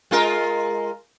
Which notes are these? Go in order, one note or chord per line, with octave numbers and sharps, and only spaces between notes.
G#3 F4 A#4